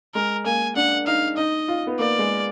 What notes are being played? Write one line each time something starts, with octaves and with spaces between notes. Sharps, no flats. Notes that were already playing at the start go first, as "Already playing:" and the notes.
G#3 A#4
A#3 G#5
D4 F#5
D#4 F5
D#4 D#5
F4
B3
A#3 D5
G#3